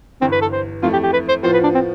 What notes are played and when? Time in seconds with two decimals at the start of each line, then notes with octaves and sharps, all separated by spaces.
0.21 G1 G2 E3 C4
0.32 B4
0.42 A4
0.52 C5
0.83 F2 E3 A3 F4
0.93 G4
1.03 G4
1.13 B4
1.29 C5
1.43 A2 F3 B3 F4 C5
1.53 B4
1.64 D4
1.74 C4